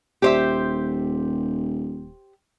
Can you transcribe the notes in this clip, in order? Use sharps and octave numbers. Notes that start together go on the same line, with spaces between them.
D#1 G4 C5 E5